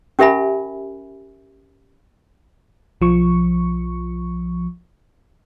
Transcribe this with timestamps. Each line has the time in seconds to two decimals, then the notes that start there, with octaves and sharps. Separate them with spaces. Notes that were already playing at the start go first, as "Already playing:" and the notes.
0.19 C#4 G4 A#4 E5 G#5 B5
3.01 B1 F3 C#6